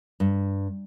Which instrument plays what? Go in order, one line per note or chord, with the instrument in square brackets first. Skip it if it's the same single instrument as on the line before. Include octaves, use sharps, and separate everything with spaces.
[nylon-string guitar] G2